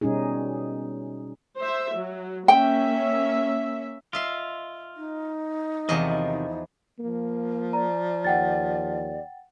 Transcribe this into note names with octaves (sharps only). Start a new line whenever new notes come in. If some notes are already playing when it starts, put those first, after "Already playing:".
B2 G3 C#4 D#4 G#4
C5 E5
F#3
A#3 C#4 E5 G5
F4 D#5 E5 C6
D#4
E2 C3 D#3 F3 D#5
F3 A#3
D5 A#5
D#2 F#5 G5 A6